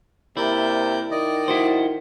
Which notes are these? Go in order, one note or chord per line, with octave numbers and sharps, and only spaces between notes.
C3 A#3 E4 D5 G6
D#3 D5 D#5
E4 F#4 C5